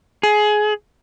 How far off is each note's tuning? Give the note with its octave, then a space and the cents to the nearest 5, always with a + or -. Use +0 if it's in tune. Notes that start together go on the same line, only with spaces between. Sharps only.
G#4 +20